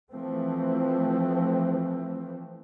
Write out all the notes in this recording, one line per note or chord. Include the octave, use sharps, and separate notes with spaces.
E3 F3 A3 C4